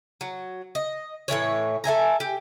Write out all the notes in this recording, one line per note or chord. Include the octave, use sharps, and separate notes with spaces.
F#3
D#5
A2 D#3 E3 C#5
A4 E5 G#5 A#5
G4